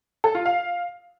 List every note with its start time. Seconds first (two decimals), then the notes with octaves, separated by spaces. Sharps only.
0.24 A4
0.35 F4
0.46 F5